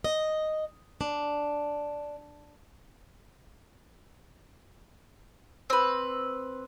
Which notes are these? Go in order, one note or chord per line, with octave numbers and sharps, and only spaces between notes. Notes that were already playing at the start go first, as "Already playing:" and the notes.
D#5
D4
C4 B4